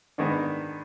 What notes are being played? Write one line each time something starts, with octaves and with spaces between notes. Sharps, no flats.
G#2 D#3 G#3 B3 D4